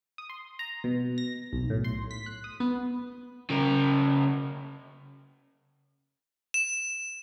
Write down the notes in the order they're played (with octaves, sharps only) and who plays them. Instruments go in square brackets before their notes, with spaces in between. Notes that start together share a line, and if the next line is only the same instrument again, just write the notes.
[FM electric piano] D#6
C6
A#5
B2
A#6
B1
A2
C6
B6
F#6
D#6
B3
[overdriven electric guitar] C#3 A#4
[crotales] E7